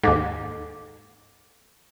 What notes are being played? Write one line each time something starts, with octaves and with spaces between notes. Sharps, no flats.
D#2 G#2 A4 D6